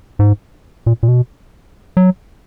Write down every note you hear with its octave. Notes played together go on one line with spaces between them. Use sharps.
G#2
A#2
A#2
B2
F#3